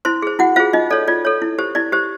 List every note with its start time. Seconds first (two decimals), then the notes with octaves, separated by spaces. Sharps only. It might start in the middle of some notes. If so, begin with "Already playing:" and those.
0.05 E4 C5 C6
0.22 G#4 C5
0.39 E4 F#4 F#5
0.56 F4 G#4 C5 F5
0.73 D#4 F4 D#5
0.90 A4 C#5 D5
1.08 F4 D5
1.25 A4 C#5
1.42 E4
1.58 G4 C5
1.75 E4 D5
1.92 G4 C5